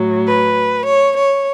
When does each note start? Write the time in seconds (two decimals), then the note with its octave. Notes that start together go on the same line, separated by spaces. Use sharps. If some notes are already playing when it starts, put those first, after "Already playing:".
Already playing: A2 F#3
0.27 B4
0.87 C#5
1.17 C#5